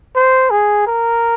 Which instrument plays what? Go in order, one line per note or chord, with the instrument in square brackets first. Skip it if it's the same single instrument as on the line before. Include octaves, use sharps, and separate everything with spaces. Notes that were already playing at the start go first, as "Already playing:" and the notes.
[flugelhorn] C5
G#4
A#4